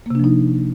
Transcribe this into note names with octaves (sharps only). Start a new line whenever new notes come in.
C3 F3 A#3 D4 D#4